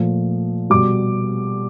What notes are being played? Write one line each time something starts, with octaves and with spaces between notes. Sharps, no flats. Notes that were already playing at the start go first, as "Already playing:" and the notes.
Already playing: A#2 F3 A3
B2 G3 D6